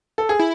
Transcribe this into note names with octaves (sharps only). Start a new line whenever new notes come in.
A4
G#4
E4